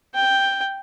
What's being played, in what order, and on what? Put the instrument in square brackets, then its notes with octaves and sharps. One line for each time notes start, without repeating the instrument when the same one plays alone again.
[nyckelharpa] G5